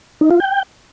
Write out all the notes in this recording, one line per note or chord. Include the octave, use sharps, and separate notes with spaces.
D#4
F4
G5